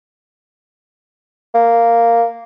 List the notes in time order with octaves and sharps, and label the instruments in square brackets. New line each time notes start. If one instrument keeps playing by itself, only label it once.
[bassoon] A#3